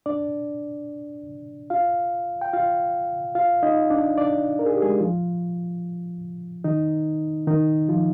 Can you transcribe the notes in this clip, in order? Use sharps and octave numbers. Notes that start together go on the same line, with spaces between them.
D4 D5
F4 F5
G5
F4 F5
F4 F5
D#4 D#5
D4 D5
D4 D5
A#4
G#4
G4
G#3 G#4
F3 F4
D#3 D#4
D#3 D#4
F3 F4